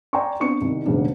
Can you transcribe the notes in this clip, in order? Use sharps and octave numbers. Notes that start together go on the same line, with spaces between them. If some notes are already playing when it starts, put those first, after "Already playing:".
D5 G5 G#5 A#5 C6 C#6
B3 C4 D4 C#6 C#7
C2 D#3
E1 A1 C#3 D4 D#4